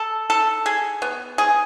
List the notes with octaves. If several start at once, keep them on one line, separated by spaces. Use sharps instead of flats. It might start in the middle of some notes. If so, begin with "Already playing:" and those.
Already playing: A4
A4
G#4
B3
G#4